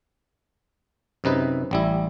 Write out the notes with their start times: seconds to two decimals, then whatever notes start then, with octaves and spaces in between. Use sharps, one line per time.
1.24 F#2 C3 D#4 B4
1.71 A1 G3 E4